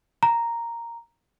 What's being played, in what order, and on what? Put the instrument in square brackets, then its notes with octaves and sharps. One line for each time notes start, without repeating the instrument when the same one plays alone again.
[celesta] A#5